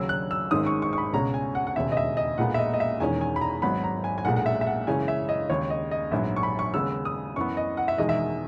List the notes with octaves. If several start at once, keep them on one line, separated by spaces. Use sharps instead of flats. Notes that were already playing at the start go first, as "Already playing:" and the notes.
Already playing: D#2 C#3 F#3 E6
F#6
E6
G#1 G#2 D#3 G#3 C#4 D#6
C#6
C#6
C#6
B5
C#2 B2 G#3 C#4 A#5
G#5
F#5
F#5
E1 D#2 C#3 E5
D#5
E5
D#5
B1 A#2 G#3 B3 F#5
E5
D#5
D#5
E5
E1 E2 D#3 G#3 C#4 G#5
G#5
B5
A#5
G#1 G#2 F#3 B3 B5
A#5
G#5
G#5
B1 A#2 G#3 F#5
F#5
E5
E5
F#5
F#2 C#3 E3 G#3 C#4 G#5
E5
D#5
D#2 C#3 G#3 C#5
D#5
D#5
A#1 G#2 F#3 B3 E5
C#6
B5
C#6
D#2 C#3 G#3 B3 E6
D#6
F#2 E3 B3 C#6
D#5
F#5
E5
E1 E2 D#3 G#3 D#5
E5